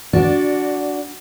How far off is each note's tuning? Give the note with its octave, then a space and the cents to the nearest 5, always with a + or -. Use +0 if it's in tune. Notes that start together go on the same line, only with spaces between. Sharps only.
D4 -15 F#4 +0 D5 +5